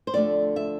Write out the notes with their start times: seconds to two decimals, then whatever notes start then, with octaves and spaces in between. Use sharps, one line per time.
0.07 C5
0.14 F2 D3 A3 D4 D5
0.56 E5